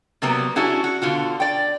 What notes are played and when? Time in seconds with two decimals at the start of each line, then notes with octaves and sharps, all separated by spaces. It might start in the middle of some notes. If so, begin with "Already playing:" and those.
0.22 C3 F#3 G3 A#3 B3
0.56 C#4 D4 E4 F#4 G#4
0.84 F#4
1.02 B2 D3 F4 F#4
1.40 D5 G5